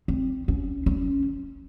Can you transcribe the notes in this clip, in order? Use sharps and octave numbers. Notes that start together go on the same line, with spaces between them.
C4
C#4
C#4